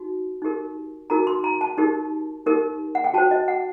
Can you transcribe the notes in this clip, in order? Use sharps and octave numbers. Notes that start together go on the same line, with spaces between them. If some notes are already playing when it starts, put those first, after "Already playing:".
Already playing: D#4 F#4
D#4 G4 A#4
D#4 F#4 A#4 A#5
C6
A#5
A5
D#4 G4 A#4
D#4 G4 A#4
F#5
G5
F#4 C5 A5
D#5
F#5